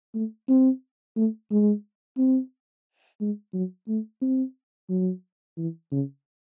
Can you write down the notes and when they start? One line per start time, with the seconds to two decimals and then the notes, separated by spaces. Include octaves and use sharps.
0.15 A3
0.49 C4
1.17 A3
1.51 G#3
2.18 C4
3.21 G#3
3.54 F#3
3.88 A3
4.22 C4
4.89 F#3
5.57 E3
5.92 C#3